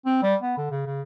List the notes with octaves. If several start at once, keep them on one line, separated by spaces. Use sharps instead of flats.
C4
G3
B3
D3
C#3
C#3